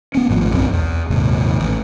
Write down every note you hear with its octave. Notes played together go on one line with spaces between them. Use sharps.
B3 C#4
G#1 A2 D#3 F3
B1 F#2 F3 C4
E2
D#1 G#2 C3
A1